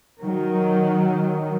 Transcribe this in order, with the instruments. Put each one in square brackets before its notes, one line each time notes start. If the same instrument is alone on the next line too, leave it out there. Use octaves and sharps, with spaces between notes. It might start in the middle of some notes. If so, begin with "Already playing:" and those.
[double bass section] D#3 F#3